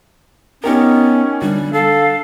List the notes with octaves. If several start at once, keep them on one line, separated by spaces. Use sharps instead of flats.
B3 C#4 D#4 G4 A#4
D3 G3
A4 F5